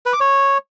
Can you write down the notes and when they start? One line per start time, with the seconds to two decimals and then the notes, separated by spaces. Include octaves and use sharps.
0.06 B4
0.13 D6
0.20 C#5